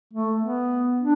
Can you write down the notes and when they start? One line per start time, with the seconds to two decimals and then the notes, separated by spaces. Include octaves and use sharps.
0.13 A3
0.42 B3
1.00 D4